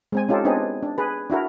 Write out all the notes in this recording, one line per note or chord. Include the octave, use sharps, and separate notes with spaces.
G#3 C4 G#5
C#4 D#4 F4 G4 A4
B3 C4 D4 D#4 G#4
D4
G#4 B4
D4 E4 F#4 A#4